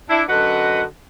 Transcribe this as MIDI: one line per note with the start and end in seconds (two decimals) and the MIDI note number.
0.10 0.23 62
0.10 0.23 64
0.29 0.82 42
0.29 0.82 50
0.29 0.82 66
0.29 0.82 71
0.29 0.82 75
0.29 0.82 78